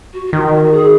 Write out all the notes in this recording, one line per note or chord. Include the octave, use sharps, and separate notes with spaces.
F#4
F#4
D#3 F4
F#4
F#4
G#4